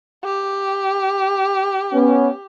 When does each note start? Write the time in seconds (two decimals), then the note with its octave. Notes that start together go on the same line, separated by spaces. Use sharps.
0.24 G4
1.93 B3 C#4